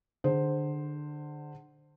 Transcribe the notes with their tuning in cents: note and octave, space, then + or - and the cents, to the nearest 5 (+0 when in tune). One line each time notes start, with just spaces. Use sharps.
D3 +25 G#4 +0 C5 +0